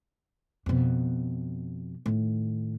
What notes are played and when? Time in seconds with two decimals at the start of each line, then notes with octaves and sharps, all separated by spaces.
0.66 F2 B2
2.06 A2 D#3